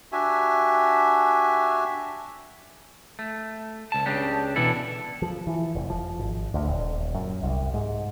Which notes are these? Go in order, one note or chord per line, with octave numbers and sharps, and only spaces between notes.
D4 F#4 G4 E5 G#5
A3
C#2 A5
C#2 C#3 D4 G4
B2 E3 D4 E4 A4
F3
E3
F1
F3
G#1
D2
D#1
F#2
C2
G#2